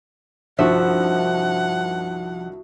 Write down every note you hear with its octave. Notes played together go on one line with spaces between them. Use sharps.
C2 G2 D#3 F3 F#4 E5 F#5